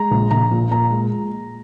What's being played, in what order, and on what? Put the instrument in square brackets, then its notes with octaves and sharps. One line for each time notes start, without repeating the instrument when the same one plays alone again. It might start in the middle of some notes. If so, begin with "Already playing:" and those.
Already playing: [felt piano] G#3 A#5
A#1
A#1 A#5
A#2
A#2 A#5
G#3